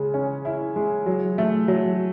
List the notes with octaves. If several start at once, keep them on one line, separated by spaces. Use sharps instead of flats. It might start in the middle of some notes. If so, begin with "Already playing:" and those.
Already playing: C#3 G#3
C#4
E4
G#3
F#3
A3
F#3